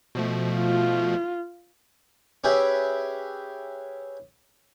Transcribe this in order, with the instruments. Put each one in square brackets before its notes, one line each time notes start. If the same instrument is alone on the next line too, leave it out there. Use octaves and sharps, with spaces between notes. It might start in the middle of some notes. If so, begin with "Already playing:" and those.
[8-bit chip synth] B2 F3 A3
[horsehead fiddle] F4
[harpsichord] C#4 G4 G#4 B4 E5 G5